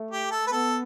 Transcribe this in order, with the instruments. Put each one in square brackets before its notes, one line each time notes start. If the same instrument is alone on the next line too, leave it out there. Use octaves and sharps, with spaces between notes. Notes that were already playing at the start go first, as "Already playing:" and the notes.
Already playing: [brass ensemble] A3
[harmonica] G4
A4
B4
[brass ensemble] B3 [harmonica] A4